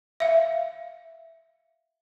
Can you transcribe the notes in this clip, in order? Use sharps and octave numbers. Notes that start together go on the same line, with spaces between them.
E5 F5